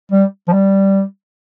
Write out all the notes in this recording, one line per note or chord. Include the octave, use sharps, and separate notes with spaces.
G3
F3
G3